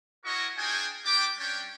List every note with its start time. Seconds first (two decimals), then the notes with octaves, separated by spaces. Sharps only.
0.24 E4 F#4 A#4 C#5 D#5 C#6
0.57 D4 D#4 F4 G#4 G5 G#5
1.05 D4 G4 G5 D6
1.38 G3 C#4 D4 C#5 G5